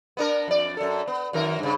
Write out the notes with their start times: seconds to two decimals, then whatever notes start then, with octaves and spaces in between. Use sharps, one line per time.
0.17 B3 D4 A#4
0.48 F2 D5
0.77 F#2 A4
1.08 B3
1.33 F#2 D#3 A#4
1.59 G2 C#3